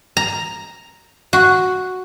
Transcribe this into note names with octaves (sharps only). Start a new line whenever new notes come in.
A#5
F#4